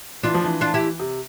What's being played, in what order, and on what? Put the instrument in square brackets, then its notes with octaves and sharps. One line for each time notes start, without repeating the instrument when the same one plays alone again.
[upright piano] E3 [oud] D4 F4
[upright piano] F3
E3
[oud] D4 F4
E4 G4
[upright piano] C3